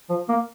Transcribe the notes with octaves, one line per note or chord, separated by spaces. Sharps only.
F3
A#3